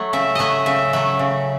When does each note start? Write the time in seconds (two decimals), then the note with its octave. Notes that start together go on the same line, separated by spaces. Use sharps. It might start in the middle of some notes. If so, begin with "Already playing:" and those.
Already playing: F#3 A3
0.13 C#3 E5
0.35 F#3 A3 D#5 E5
0.66 C#3 E5
0.93 F#3 A3 E5
1.19 C#3